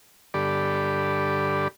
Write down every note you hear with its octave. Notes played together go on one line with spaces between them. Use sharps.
G2 D3 G4 A4 D5 B5